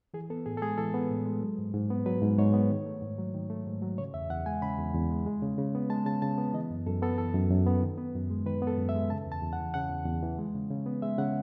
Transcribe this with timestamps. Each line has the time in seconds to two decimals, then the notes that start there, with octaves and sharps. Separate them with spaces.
0.14 E3 G#4
0.30 B3 A4
0.46 A2 G#4
0.57 A4
0.62 G#3 G#4
0.78 E3 A4
0.94 B3
1.10 A2
1.25 G#3
1.42 F#3
1.58 G#2
1.74 G#2
1.90 B3
2.06 F#3 B4
2.22 G#2
2.38 G#2 C#5
2.53 B3
2.70 D#3
2.86 A3
3.02 G#2
3.18 F#3
3.34 D#3
3.50 A3
3.66 G#2
3.82 F#3
3.98 C#3 C#5
4.14 E2 E5
4.30 E2 F#5
4.46 G#3 G#5
4.62 C#3 B5
4.78 E2
4.94 E2
5.11 G#3
5.26 G#3
5.42 C#3
5.58 C#3
5.75 B3
5.90 G#3 A5
6.06 C#3 A5
6.22 C#3 A5
6.38 B3
6.54 E3 D#5
6.70 F#2
6.86 F#2 A4
7.02 B3 A4
7.18 E3 A4
7.34 F#2
7.50 F#2
7.66 B3
7.82 D#3
7.98 B3
8.15 F#2
8.30 G#3
8.46 D#3 B4
8.62 B3 A4
8.78 F#2
8.89 E5
8.95 G#3
9.10 C#3 A5
9.26 E2
9.32 A5
9.42 E2
9.53 F#5
9.59 E3
9.74 C#3 F#5
9.90 E2
10.06 E2
10.23 E3
10.38 G#3
10.54 C#3
10.71 C#3
10.86 B3
11.02 G#3 E5
11.18 C#3 F#5